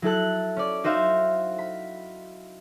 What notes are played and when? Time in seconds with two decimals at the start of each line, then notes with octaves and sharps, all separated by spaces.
0.02 F#3 E4 A4 F#6
0.57 C#4 D5
0.84 D#4 F#4 C5 E5 F5
1.58 B5